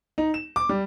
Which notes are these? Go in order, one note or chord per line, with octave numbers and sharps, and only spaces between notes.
D#4
E7
D6
G3